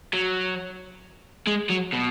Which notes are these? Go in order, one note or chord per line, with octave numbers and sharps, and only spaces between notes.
F#3
G#3
F#3
B2